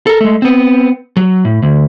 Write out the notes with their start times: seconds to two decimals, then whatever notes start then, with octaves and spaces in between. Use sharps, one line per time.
0.07 A4 A#4
0.21 G#3 A3
0.42 B3 C4
1.17 F#3
1.45 A2
1.63 D2